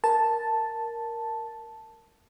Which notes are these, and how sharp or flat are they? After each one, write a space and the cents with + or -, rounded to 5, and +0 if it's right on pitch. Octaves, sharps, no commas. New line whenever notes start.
A#4 +0 A5 +0